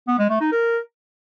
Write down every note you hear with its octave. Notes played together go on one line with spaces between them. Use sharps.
B3
G#3
A3
D#4
A#4